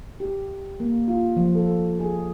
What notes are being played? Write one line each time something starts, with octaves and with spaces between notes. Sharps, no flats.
G4
A#3
F4
F3
A4
G#4